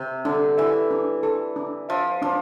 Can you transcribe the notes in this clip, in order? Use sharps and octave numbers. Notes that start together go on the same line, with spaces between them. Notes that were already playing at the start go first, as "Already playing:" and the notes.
Already playing: C3
D3 D4
E3 E5
D4
A4
D4
F3 E5
F3 D4